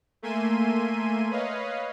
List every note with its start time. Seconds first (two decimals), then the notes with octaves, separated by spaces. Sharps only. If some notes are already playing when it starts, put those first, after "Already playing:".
0.22 A3 A#3 E5 G#5 C6 D#7
1.31 B4 C#5 D#5 F5